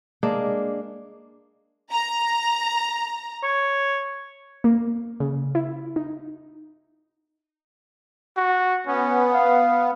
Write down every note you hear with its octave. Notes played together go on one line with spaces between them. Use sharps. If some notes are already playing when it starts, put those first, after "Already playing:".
G#3 A#3 D4
A#5
C#5
A#3
C#3
E4
D#4
F#4
B3 C#4
F5